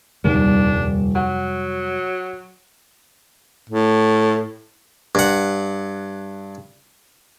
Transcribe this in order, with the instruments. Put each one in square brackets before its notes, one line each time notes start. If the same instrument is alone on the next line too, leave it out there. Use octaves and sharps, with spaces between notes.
[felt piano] D#1 D#3 [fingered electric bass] F2 C3 G3 [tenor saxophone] D4
[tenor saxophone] F#3 [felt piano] F#5
[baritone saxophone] A2
[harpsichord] G2 F#5